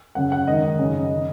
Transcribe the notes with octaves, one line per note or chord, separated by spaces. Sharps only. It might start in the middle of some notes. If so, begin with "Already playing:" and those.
F#2 C#3 F#5
F#5
G#2 D#3 D#5
F#2 C#3
D#3